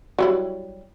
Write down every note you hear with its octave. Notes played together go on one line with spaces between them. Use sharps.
F#3 G3 E4